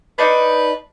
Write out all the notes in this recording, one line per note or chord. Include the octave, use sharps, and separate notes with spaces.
D4 D#4 B4